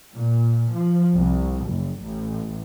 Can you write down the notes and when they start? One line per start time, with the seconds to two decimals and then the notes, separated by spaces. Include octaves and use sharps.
0.15 A#2
0.74 F3
1.16 C2
1.69 F#1
2.03 A1